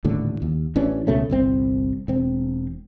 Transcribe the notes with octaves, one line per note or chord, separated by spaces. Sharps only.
D#1 A2 D3
D#2
A1 E3 C#4 D4
C#2 B2 A3 C#4
G1 C2 C4
E1 C4